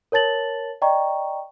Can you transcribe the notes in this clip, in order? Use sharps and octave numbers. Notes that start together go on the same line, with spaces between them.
A#4 C#5 A5 A6 F#7
D5 D#5 G5 A#5 C#6